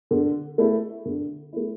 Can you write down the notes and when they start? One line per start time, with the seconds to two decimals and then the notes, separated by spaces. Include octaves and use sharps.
0.11 D3
0.58 A3 E4
1.05 D3
1.53 A3 E4